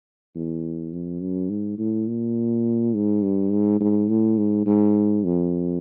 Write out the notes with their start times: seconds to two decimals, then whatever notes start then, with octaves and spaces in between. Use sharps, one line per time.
0.35 E2
0.93 F2
1.21 F#2
1.50 G#2
1.79 A2
2.08 A#2
2.94 G#2
3.22 G2
3.51 G#2
3.80 G#2
4.09 A2
4.37 G#2
4.66 G#2
5.24 F2